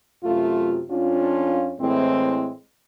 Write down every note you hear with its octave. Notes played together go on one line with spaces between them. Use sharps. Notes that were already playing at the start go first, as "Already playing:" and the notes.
F#2 C3 A3 F4
F2 C#4 D4 F4
A2 E3 G#3 C4